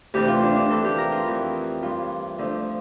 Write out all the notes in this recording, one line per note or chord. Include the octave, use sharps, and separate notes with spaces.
D2 C3 E3 G4
F4
D4
D4
F2 E3 A4
G4
A#4
F4
F2 E3
G2 E3 F4
D2 D3 F3